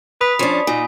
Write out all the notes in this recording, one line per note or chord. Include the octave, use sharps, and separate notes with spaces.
B4 B5 D#6 B6
F3 C#4 D4
A#2 D#4 G#5